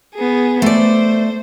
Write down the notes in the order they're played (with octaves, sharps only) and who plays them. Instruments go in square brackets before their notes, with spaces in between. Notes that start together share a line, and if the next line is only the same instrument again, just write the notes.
[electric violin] B3 G#4
[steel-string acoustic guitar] A3 D5 [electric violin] C5